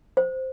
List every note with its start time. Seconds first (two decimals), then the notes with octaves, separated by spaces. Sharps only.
0.17 C5